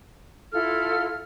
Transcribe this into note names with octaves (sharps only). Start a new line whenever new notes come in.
E4 F4 A4 F6